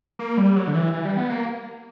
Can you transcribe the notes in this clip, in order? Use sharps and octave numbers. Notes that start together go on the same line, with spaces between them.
A#3
G3
F#3
D3
E3
E3
G3
B3
A#3